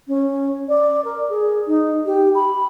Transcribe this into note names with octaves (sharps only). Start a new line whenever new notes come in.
C#4
D5
A#4
G#4
D#4
G4
B5